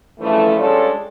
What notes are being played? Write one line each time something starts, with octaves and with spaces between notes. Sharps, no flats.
G2 C#3 E3 F3 A3
G3 G#3 C#4 D4 F4 A4